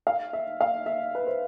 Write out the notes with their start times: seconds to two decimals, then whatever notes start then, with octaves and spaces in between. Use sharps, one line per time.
0.07 F5
0.33 E5
0.61 F5
0.86 E5
1.15 B4
1.27 C5